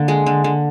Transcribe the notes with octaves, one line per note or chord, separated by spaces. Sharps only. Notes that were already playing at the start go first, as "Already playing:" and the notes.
Already playing: D3 A#3
G#3
D3
D3